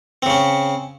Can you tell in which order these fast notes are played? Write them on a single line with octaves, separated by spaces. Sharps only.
C4 C#3 C#4